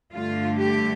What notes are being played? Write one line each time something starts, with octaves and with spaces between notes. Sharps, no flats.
G2 D3 A3 F4
G4